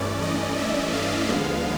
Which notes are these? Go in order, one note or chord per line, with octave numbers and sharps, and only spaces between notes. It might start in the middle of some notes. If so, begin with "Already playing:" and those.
Already playing: G2 E3 A3 C#4 D5
D#5
E5
F5
D#2 D3 F3 G#3 B3